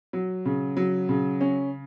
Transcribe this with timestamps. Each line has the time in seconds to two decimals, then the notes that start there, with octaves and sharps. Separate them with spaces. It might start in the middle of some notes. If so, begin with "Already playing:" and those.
0.13 F#3
0.45 C#3
0.77 F#3
1.09 C#3
1.41 C#4